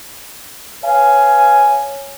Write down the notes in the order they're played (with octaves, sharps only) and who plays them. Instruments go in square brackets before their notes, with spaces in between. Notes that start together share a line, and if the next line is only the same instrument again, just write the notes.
[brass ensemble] B4 C#5 F5 G#5